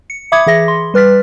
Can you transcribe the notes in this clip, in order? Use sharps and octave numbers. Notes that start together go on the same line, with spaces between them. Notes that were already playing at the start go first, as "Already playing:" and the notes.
C#7
E5 B5 D6 D#6 G#6 C#7
E3 G#4 E5 A#6
C6
G3 B4 F6 A6 B6